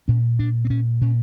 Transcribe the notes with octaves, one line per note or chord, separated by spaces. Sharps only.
A#2 C#4
A#2 D4
C4
A#2 C#4
A#2 C#4